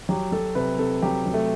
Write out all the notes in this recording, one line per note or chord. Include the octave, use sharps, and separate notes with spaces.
F#3 G4
F#3 A4
C3 B4
C3 A4
F#3 G4
F#3
A3